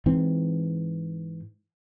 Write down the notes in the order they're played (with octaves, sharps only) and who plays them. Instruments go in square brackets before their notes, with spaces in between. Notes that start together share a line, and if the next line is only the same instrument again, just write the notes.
[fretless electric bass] G#2 E3 C4